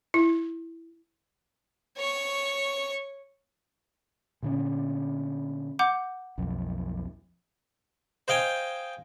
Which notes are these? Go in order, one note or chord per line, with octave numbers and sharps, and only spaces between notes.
E4
C#5 C#6
A#2 D3 C#4
F#5 D6 G6
B1 F2
C5 D#5 F5 G5 G#5